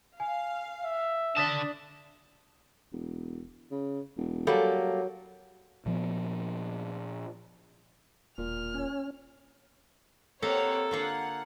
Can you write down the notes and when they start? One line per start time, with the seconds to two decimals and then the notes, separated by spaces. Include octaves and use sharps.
0.20 F5 G#5
0.85 E5
1.37 D3 D4 A5 D#6 A6 B6
2.92 E1
3.71 C#3
4.17 E1
4.47 F#3 G3 A#3 A4
5.86 A#2 F3 B3
8.38 E1 A#2 F6
8.74 C#4
10.43 A#3 C4 G4 A4 C#5 D#5 F#5
10.91 D3 A#3 F4 F#5